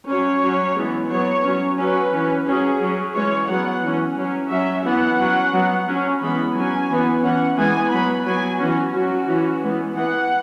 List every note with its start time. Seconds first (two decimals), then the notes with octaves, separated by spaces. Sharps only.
0.08 F#3 C#4 C#5
0.43 F#3 C#4
0.76 E3 G#3 B3
1.10 F#3 B3 C#5
1.45 F#3 C#4
1.79 F#3 C#4 B4
2.12 E3 C#4
2.47 F#3 C#4 G#4
2.81 F#3 C#4
3.15 E3 G#3 C#4 C#5
3.48 F#3 B3 F#5
3.83 E3 C#4
4.17 F#3 C#4
4.51 F#3 C#4 E5
4.85 E3 B3 F#5
5.20 F#3 C#4
5.54 F#3 B3
5.88 F#3 C#4
6.21 E3 G#3 B3 B5
6.55 F#3 C#4 G#5
6.89 E3 B3
7.24 E3 C#4 F#5
7.58 E3 G#3 B3 G#5
7.91 F#3 B3 B5
8.26 F#3 B3 G#5
8.60 E3 C#4 F#4
8.94 F#3 C#4 F#4
9.28 E3 C#4
9.63 E3 G#3 B3
9.95 E3 B3 F#5